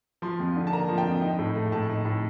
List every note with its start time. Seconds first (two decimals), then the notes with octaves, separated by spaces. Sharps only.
0.22 F3 C6
0.40 F2
0.56 D3
0.67 A5
0.72 A#3 A#5
0.89 F3
0.98 G5
1.06 F2
1.22 D#4
1.39 A2
1.55 A3
1.72 A2 A5
1.89 D#4
2.05 A2